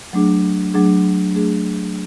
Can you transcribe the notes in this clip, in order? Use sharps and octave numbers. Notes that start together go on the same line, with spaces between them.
F#3 A3 D4 G#4
F#3 A3 D4 G#4
A3 D4 G#4